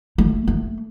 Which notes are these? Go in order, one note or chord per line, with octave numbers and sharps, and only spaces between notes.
A3
A3